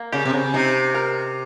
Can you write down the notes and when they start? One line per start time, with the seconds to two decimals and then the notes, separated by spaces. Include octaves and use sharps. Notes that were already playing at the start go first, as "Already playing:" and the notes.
Already playing: A#3
0.12 C#3 G4
0.25 C3
0.33 C#3
0.54 C3 D#4
0.94 A#4